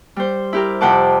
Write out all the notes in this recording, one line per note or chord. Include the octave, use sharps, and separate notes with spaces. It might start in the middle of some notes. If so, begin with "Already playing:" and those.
G3 C5
E4 G4 A#4
F2 C3 C5 F#5 A5 D6